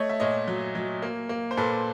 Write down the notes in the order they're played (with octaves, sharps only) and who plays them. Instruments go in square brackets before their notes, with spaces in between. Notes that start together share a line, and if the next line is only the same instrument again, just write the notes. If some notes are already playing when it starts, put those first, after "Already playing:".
Already playing: [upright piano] A3 C#5 D#5
E5
A#2 C#5 D#5
F#3
F#3
A#3
A#3
C5
A#2 A4 B4